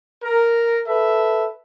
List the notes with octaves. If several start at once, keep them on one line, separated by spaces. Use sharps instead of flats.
A#4
A4 B4 E5